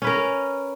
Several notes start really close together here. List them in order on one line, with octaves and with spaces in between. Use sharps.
C#4 B4 A#4